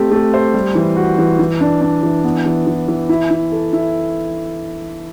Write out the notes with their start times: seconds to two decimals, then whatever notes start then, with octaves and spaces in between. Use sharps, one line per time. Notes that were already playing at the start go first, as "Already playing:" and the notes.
Already playing: A3 C4 G4
0.12 A3
0.34 C5
0.54 G3
0.75 E3
0.96 F#4
1.18 E3
1.39 E3
1.61 D4
1.81 D4
2.03 E3
2.24 B3
2.46 E3
2.67 E3
2.88 E3
3.09 E4
3.31 E4
3.52 A4
3.73 E4